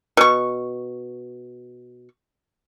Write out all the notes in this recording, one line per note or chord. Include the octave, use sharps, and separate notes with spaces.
B2 C#6